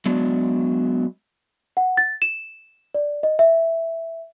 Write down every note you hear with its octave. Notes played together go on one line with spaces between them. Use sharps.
F#3 G#3 B3 D4
F#5
A6
E7
D5
D#5
E5